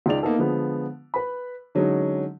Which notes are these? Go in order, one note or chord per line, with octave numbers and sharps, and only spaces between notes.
C#2 D#4 G#4 D5 F7
A#3 B3 D#4 A4
D3 F3 G#3 B3
B4 B5
D3 F#3 G#3 C#4 D#4